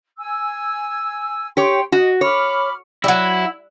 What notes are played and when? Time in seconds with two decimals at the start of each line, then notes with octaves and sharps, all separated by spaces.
0.18 G#5 E6
1.57 G4 C#5 G5 C6
1.92 F#4 D#5
2.21 C#5 B5 D6 F6
3.04 F#3 G3 E4